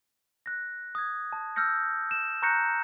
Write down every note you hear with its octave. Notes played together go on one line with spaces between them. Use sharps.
F#6 A#6
D#6 G#6
A5
E6 F6 G6 A#6 C#7
E7
A#5 C#6 F#6 G6 A#6 C#7